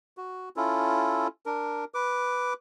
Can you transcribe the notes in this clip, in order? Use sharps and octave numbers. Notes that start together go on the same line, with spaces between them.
F#4
C#4 E4 F4 A4
D4 A#4
B4 D6